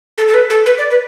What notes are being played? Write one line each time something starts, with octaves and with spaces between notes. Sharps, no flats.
A4
A4
B4
A4
B4
D5
B4